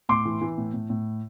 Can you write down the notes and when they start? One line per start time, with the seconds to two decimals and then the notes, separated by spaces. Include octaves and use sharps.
0.09 A2 C6 D6
0.25 E3
0.41 E3
0.58 A2
0.73 A2
0.90 A2